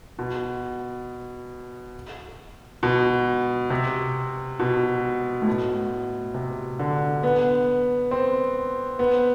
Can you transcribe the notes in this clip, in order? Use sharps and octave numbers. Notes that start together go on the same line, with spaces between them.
B2
B2
C3
B2
A2
B2
C3
D3
B3
C4
B3